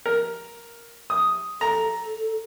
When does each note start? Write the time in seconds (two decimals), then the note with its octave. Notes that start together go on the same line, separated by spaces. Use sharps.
0.06 A#4
1.10 D#6
1.61 A4 A#5